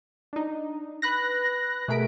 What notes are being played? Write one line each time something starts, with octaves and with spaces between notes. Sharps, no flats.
D4 D#4
B4 B5 F#6 A#6
B2 A3 G#4 A#4 B6 D7